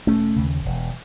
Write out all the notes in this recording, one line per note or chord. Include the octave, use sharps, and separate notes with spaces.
E1 A3 C#4
D#2 C#3
E1